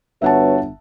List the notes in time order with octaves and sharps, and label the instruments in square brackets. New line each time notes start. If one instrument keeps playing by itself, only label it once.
[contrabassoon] G1 [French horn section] F#4 B4 C#5 [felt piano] E5 F#5 A5